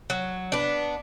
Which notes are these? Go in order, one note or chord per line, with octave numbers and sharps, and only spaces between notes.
F#3
B3 D4